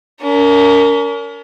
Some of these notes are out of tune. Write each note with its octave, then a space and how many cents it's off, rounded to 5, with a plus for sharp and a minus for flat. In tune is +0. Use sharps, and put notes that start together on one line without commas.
C#4 +40 A#4 -10